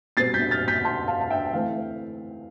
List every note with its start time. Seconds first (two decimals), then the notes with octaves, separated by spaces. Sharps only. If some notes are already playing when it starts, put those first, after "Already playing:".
0.17 B2 G3 C4 A6 C7
0.34 G6 B6
0.51 F6 A6
0.68 G6 B6
0.85 A5 C6
1.08 F5 A5
1.21 A5
1.31 E5 G5
1.53 E3 A3 C4 F5